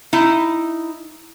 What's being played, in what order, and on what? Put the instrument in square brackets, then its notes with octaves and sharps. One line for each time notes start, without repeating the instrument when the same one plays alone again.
[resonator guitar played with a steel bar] D#4 E4